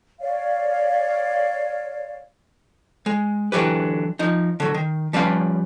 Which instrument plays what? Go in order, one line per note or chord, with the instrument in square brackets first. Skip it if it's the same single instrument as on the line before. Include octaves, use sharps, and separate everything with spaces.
[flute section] C#5 D5 F5
[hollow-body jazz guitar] G#3
D3 E3 F#3 G4 B4
F3 D#4
D3 F#3
D#3
F3 G3 C#4 B4 F5